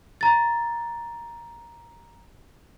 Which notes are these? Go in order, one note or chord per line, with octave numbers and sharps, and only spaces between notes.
A#5 A6